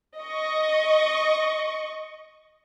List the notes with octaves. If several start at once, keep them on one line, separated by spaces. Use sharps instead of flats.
D#5 C#6